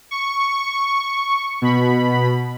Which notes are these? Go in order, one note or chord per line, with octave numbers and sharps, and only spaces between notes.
C#6
B2 B5